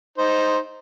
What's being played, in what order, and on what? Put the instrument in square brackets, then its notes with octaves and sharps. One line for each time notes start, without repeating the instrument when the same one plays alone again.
[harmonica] D#4 C5